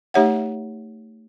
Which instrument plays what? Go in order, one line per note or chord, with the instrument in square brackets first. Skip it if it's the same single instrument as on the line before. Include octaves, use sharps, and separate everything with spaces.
[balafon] A3 D#4 G4 C#5 E5 F#5